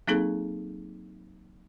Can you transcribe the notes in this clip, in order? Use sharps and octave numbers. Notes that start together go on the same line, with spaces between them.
F#3 A#3 C4 D#4 G#4 A4